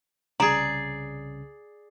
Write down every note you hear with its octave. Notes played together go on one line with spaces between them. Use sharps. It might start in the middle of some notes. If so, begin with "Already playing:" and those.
C2 C#3 G#4 D5 A#5